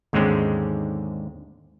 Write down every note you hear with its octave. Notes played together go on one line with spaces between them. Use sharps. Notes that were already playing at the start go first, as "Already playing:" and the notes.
D#2 G#2 D3 G#3 C4 C#4